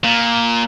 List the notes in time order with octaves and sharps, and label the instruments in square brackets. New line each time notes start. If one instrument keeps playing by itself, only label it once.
[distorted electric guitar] A#2